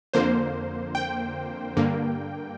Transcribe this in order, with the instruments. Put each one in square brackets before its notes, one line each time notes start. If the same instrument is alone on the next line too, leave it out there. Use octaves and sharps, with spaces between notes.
[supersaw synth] F2 D3 A#3 C5
G5
G2 D3 A#3